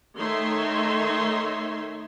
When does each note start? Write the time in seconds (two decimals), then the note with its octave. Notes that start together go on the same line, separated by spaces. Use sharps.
0.17 D#3 A3 D#4 C#5 E5 C6